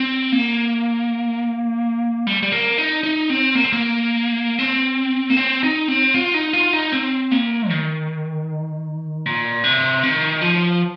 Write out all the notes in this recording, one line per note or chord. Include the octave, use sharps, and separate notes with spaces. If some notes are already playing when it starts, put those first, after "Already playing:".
Already playing: C4
A#3
G3
G3
A#3
D#4
D#4
C4
A#3
C4
A#3
C4
A#3
C4
D#4
C4
F4
D#4
F4
D#4
C4
A#3
D#3
A#2
C3
D#3
F3